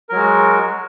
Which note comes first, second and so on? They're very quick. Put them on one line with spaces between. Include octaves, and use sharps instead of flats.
A#4 F#3 G#3 F#4